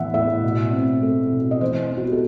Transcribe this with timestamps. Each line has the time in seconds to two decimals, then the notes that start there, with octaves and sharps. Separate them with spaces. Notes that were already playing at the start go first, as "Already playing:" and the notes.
Already playing: A2 E3 B3 E5 F#5
0.14 A2 E5
0.43 B2
0.73 C4
1.03 A3
1.32 B2
1.51 D#5
1.61 E3 C5
1.91 B3
1.97 F#4
2.05 G4
2.12 A4